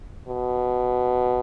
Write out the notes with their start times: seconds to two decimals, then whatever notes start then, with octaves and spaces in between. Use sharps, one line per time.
0.28 B2